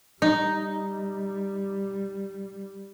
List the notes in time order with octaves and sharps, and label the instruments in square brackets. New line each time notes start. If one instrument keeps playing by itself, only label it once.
[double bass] G3 [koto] D#4